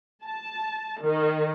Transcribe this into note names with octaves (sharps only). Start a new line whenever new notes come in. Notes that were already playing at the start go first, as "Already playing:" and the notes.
A5
D#3